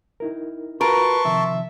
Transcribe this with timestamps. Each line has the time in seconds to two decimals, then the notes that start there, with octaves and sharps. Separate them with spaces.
0.20 D#4 E4 A#4
0.81 F4 F#4 A#4 B4 A5 C6 C#6
1.25 C3 D#3 F3 E5